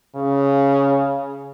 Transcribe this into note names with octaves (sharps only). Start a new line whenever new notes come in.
C#3